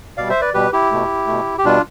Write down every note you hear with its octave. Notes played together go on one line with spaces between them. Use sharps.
B2 G3 D5 F5
C5 E5
B4 D5
B2 G3 G4 B4
E4 G4
B2 A3
B2 A3
G4
B2 G3 D4 F4